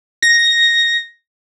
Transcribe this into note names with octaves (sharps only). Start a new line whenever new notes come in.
A#6